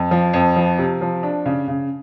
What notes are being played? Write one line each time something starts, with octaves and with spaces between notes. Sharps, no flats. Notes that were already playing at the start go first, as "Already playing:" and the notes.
Already playing: F2
F3
F2
F3
C3
F3
D4
C#3
C#3